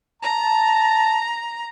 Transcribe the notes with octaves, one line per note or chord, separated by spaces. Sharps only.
A5 A#5